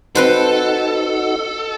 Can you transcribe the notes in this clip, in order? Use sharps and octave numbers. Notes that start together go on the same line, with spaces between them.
C4 D#4 F#4 A4 B4 C5